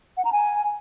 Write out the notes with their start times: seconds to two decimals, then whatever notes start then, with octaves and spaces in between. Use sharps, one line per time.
0.17 F#5
0.25 A#5
0.32 G#5